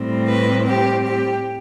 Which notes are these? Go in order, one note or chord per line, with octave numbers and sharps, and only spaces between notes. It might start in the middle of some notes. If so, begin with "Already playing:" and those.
Already playing: A2 G3 C4
B4
G4
G4